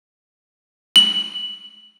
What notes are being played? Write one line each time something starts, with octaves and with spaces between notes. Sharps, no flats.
F#7